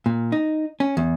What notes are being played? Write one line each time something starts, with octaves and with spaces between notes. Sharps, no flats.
A#2
D#4
C#4
E2